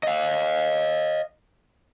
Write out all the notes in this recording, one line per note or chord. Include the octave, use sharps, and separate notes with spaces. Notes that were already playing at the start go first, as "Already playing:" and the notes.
D#5 F5